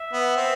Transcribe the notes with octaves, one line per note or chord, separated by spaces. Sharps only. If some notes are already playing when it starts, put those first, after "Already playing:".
Already playing: E5
B3
C4